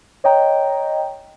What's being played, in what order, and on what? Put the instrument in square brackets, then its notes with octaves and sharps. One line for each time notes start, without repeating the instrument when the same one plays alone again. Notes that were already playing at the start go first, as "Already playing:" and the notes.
[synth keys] C#5 D#5 G5 A#5